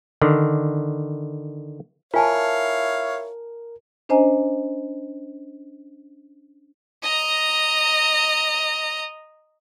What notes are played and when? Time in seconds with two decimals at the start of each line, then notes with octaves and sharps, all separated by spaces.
0.21 D3 D#3
2.14 E4 F4 A#4 C#5 F5 G#5 A5
4.09 C#4 D4 C5 D#5 G#5 A#5
7.03 D#5 A#5